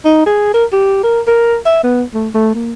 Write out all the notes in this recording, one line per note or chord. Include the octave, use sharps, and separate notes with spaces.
D#4
G#4
A#4
G4
A#4
A#4
E5
B3
A3
A3
A#3